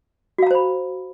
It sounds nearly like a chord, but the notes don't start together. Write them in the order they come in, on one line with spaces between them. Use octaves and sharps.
F#4 F5 A#5 C5 B5